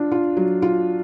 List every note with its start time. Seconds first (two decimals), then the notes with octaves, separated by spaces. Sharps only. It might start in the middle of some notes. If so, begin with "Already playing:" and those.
Already playing: D4 F4
0.11 F4
0.37 F#3
0.62 F4